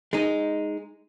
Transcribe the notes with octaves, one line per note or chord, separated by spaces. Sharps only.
G#3 D#4